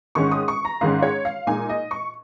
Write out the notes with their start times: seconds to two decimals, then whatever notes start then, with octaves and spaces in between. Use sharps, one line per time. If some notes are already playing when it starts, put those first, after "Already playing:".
0.15 G#2 D#3 G#3 C#4 C#6
0.31 D#6
0.48 C#6
0.65 A#5
0.81 G#2 D#3 G#3 C#4 F5
1.02 C#5
1.25 F5
1.47 A#2 G#3 D#4 G#5
1.69 D#5
1.91 C#6